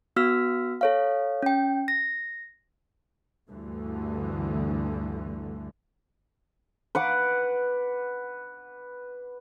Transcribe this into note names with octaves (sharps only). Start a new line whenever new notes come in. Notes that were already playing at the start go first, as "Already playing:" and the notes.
B3 F#4 E6 F6 B6
A4 C#5 F5
C#4 G5
A#6
D2 G2 D3 E3 A3
B4 F#5 D6